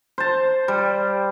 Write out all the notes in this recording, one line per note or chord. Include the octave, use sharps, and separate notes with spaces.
C5 A5
G3